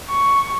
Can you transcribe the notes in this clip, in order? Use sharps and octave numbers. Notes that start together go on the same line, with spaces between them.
C#6